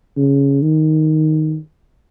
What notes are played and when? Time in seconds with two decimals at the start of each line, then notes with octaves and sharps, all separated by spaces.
0.17 C#3
0.62 D#3